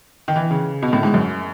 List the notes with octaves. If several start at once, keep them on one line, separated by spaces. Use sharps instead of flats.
D#3
E3
C#3
B2
A2
G#2
F#2